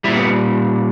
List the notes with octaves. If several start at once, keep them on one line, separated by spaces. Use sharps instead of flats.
A#2 G3 E4
B3